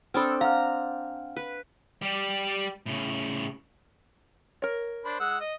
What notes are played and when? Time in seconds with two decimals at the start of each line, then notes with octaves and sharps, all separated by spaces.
0.14 C4 D4 A4 B5 D#6 F6
0.41 F5 F#5 A#5 F6
1.36 B4
2.02 G3 G4
2.86 A2 C#3
4.62 A#4 C#5
5.05 D4 C5 B5
5.20 G#3 F#5 E6
5.41 D#5